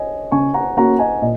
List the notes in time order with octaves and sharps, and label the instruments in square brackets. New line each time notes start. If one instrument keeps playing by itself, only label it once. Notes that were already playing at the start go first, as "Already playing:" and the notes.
Already playing: [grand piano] C#5 D#5 G#5
[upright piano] C#3 [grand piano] G#5 C#6
[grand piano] F#5 A#5
[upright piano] A#3 C#4 F#4 [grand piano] F#5 A#5
[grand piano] D#5 G#5
[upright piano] A#2 [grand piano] D#5